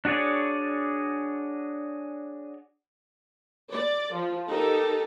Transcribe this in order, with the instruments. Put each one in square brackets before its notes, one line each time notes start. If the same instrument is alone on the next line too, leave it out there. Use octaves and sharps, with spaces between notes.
[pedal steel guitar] D4 F#4 G#4 C#5 D5
[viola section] D5
F3
D#4 G4 A4 A#4